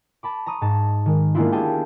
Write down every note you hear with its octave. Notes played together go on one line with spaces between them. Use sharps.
A5 B5 D6
A#5 C#6 D#6 D#7
G#2 D#4 A5
D#3 G#3
G#3 A#3 B3 D4 E4 F4
G4 G#4 G5 A5